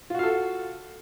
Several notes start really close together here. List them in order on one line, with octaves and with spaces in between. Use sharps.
F4 F#4 F5 A4